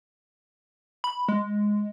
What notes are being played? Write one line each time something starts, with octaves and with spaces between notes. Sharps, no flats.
B5
G#3